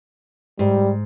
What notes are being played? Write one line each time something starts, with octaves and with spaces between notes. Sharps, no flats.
G#2 G3